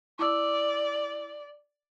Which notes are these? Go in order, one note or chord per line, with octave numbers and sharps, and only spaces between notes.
E4 D5 D6 E6